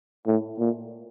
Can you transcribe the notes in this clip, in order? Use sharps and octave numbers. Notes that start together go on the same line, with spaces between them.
A2
A#2